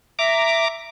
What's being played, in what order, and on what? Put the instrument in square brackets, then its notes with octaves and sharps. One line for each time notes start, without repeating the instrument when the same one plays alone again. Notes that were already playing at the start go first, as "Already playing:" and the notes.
[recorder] E5 [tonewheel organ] A#5 D6